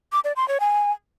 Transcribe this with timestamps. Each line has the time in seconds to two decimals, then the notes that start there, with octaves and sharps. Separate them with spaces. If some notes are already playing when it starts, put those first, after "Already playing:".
0.12 D6
0.24 D5
0.36 C6
0.48 C#5
0.60 G#5